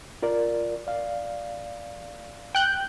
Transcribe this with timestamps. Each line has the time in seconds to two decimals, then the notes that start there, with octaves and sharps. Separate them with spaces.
0.22 F4 A#4 D5
0.87 D5 F5
2.55 G5 F#6 G6